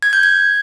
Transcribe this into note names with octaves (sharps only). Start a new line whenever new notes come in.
G#6
G6
G#6